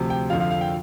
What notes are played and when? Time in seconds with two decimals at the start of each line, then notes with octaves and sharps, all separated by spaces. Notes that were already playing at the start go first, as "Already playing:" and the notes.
Already playing: D2 C3 F3
0.10 G5
0.30 F2 D3 F3 F5
0.40 F5
0.51 F5
0.61 G5